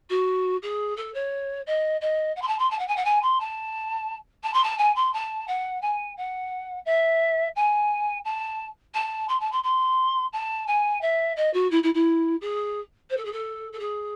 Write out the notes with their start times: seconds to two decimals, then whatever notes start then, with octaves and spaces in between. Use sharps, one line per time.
0.10 F#4
0.62 G#4
0.97 A4
1.14 C#5
1.67 D#5
2.01 D#5
2.36 F#5
2.42 C6
2.48 A5
2.59 C6
2.70 A5
2.79 F#5
2.88 G#5
2.96 F#5
3.05 G#5
3.22 C6
3.40 A5
4.43 A5
4.54 C6
4.64 A5
4.78 G#5
4.96 C6
5.13 A5
5.48 F#5
5.82 G#5
6.17 F#5
6.86 E5
7.56 G#5
8.25 A5
8.94 A5
9.29 C6
9.40 A5
9.52 C6
9.63 C6
10.33 A5
10.67 G#5
11.01 E5
11.36 D#5
11.53 F#4
11.71 E4
11.83 E4
11.94 E4
12.41 G#4
13.10 C5
13.17 A4
13.25 G#4
13.32 A4
13.72 A4
13.79 G#4